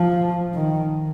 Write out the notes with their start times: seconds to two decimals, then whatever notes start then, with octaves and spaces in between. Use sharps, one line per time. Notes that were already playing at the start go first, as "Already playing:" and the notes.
Already playing: F3
0.54 D#3